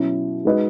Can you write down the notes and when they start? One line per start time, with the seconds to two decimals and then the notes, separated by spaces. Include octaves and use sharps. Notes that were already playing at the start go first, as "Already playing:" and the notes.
Already playing: B2 F#3 C#4 E4
0.45 G#3 D#4 F#4 B4 D#5